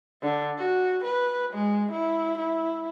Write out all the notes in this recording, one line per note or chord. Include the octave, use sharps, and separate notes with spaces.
D3
F#4
B4
G#3
E4
E4